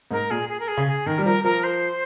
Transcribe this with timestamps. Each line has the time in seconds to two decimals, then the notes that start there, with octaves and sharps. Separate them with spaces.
0.11 G#2 A#4
0.30 A#2 G#4
0.49 G#4
0.60 A#4
0.68 G#4
0.77 C#3
0.87 G#4
1.06 D#3 A#4
1.18 G3
1.25 F3 A#4
1.44 F3 A#4
1.64 C5